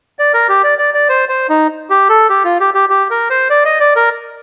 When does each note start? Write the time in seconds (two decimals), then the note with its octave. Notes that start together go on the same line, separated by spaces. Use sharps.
0.19 D5
0.34 A#4
0.49 G4
0.64 D5
0.78 D5
0.94 D5
1.09 C5
1.29 C5
1.49 D#4
1.90 G4
2.09 A4
2.30 G4
2.44 F4
2.60 G4
2.74 G4
2.89 G4
3.10 A#4
3.30 C5
3.50 D5
3.65 D#5
3.80 D5
3.96 A#4